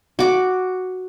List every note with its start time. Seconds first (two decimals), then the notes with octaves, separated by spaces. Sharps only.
0.19 F#4 D6